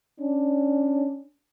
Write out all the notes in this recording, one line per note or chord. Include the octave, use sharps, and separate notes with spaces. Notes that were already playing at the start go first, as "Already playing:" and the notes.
C#4 D4